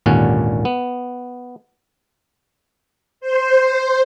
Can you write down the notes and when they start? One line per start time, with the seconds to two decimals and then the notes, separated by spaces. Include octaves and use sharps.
0.06 G#1 D#2 A#2 D3 C#4 F#5
0.65 B3
3.21 C5